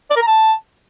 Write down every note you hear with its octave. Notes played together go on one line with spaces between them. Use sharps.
D5
A#4
A#5
A5